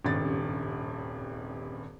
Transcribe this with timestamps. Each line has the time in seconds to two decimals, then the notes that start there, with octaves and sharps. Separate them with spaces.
0.05 D#1 G#1 G2 C#3 A6